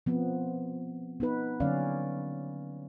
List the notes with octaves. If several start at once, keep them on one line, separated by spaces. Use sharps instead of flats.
F3 B3 C4
B3 D#4 B4
D3 F#3 A#3 C#4 D5 F5